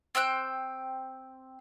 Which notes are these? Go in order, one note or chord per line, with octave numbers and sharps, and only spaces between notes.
C4 G5 E6 F#6